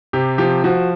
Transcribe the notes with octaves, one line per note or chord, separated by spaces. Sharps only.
C3 G4
F3 G4
F3 F#4